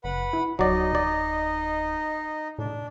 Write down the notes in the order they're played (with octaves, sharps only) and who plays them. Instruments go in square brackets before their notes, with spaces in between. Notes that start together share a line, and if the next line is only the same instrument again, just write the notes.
[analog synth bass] F#1 [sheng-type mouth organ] B4 F#5 B5
[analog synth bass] E4
[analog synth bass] D1 [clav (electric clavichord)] F#3 D5 [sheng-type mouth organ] D#4 D#5
[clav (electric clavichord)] D5
[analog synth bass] A2 [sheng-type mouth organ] D4